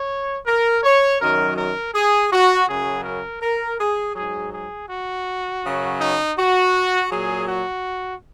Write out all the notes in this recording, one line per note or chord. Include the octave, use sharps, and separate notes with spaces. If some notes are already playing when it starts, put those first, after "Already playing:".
Already playing: C#5
A#4
C#5
F#2 D#3 F#3 A#4
A#4
G#4
F#4
F#2 C#3 F#3 G#4
A#4
A#4
G#4
G#2 F#3 G#4
G#4
F#4
F#2 C#3 F#3
D#4
F#4
A#2 F#3 G#4
F#4